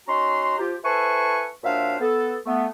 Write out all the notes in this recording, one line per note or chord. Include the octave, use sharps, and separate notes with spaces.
C#4 D#4 F#4 A#5 C6
F3 F4 G4
E4 A4 B4 C5 G#5 C#6
A#2 F#3 D4 C5 E5 F5
B3 A4
A3 B3